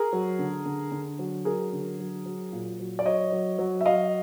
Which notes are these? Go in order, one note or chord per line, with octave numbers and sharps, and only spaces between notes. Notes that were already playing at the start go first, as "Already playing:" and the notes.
Already playing: G#4 A#4
F#3
D3
D3
D3
F#3
F#3 G#4 A#4
D3
F#3
F#3
A#2
F#3
D5
F#3 C#5 D#5
F#3
F#3
E5
F#3 D#5 F5